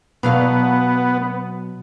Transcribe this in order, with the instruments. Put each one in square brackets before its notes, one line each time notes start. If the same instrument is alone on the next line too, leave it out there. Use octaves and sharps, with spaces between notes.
[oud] B2 F#3 F5 [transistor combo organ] B3